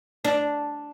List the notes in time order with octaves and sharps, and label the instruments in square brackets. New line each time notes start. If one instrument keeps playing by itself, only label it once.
[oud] D4